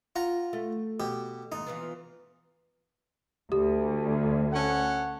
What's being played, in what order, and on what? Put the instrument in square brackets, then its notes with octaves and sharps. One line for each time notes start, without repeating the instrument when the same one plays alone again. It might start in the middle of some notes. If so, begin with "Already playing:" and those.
[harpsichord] F4 F#5 A#5
[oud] A3
[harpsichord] B2 G4
[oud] D#2 G#2 [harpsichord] D#4
[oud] E3 F3 B3
[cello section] D2 [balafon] G4
[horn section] C#4 A4 F#5